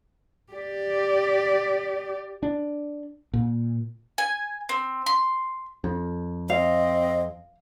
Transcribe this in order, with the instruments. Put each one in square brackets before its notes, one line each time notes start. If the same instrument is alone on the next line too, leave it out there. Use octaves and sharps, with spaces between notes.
[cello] G4 D5
[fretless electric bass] D4
A#2
[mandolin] G#5
C4
C6
[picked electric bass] F2
[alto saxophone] C4 [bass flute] D#5 [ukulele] F5